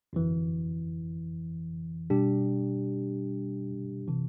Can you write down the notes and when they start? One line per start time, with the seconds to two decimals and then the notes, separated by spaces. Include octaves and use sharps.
0.13 G1 F2 E3
2.10 B2 G3 D4 G4
4.08 C3 E3